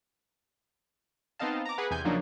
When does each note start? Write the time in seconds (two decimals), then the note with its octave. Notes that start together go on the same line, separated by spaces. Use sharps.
1.39 B3 C4 D#4 D#5 F5 A5
1.66 A#5 D6
1.78 G#4 B4 F#5
1.91 E2 C3 G#5 G6
2.05 C#3 F3 F#3 A#3 D4 D#4